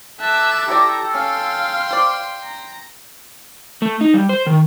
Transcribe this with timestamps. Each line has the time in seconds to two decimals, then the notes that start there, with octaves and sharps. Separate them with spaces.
0.20 A4 E5 A5 D6 F#6
0.68 E4 G4 C#5 D5 A#5
1.14 C#4 F5 G5 C6 F6
1.91 C5 D5
2.44 A#5
3.82 A3
4.01 D#4
4.14 G3
4.29 C5
4.47 D#3